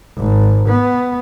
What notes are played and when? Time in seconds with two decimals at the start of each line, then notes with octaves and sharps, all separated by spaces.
0.17 G#1
0.68 B3